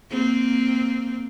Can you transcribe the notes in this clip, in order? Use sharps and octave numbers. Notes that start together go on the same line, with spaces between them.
A#3 C4